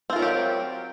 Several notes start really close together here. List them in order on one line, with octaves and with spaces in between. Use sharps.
C4 F4 A#4 F#3 G4